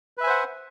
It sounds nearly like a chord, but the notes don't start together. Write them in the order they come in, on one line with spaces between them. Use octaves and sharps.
B4 E5 G#5 C5 F#5